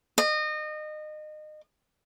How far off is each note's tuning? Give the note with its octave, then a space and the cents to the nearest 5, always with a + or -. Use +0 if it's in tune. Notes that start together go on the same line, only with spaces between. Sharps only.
D#5 -30